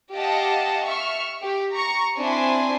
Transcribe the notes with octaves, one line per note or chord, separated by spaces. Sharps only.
G4 D#5 F5 F#5 A5
E5 C#6 F6
G4
A#5 C#6
C4 D4 E4 G#5 C6